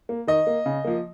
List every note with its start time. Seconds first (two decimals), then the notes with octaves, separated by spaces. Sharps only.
0.09 A#3
0.27 D#3 D#5
0.47 A#3
0.66 C#3
0.85 F3 A#3